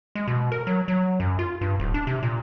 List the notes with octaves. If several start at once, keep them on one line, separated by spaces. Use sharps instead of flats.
G#3
B2
A#4
F#3
F#3
F#2
F4
G2
D1
D4
C3
A#2